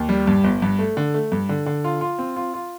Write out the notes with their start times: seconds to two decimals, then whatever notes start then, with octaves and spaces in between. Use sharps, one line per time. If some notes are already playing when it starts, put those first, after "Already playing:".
Already playing: D#2
0.09 G3
0.27 G2
0.44 G1
0.62 G2
0.79 A3
0.97 D3
1.14 A3
1.32 G2
1.49 D3
1.66 D3
1.84 F4
2.01 F4
2.19 C4
2.36 F4
2.54 F4